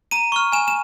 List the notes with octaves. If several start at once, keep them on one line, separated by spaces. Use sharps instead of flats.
A#5 D#7
C#6 F6
G#5 E7
E7